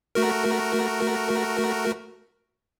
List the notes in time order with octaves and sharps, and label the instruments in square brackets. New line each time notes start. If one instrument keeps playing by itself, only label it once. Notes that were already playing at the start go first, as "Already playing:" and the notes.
[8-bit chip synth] A3 F#4 A#4